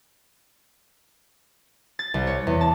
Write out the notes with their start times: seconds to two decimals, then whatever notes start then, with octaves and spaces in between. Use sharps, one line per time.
1.99 A6
2.14 C2
2.27 C#5
2.47 E2
2.61 A5